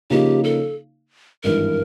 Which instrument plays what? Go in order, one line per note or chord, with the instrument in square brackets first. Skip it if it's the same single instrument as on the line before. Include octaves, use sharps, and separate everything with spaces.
[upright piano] C#3 F3 A#3 D#4 [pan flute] G4
[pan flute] A4
[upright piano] G#1 G2 E3 [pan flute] A#4